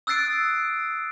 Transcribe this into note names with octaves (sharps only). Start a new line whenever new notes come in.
D#6 E6 F#6 A6 C7 D7